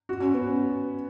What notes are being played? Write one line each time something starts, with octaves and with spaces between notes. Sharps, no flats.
F#4
C#4
B3